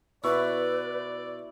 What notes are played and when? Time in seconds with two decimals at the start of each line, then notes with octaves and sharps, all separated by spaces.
0.24 B2 E4 B4 D5 C#6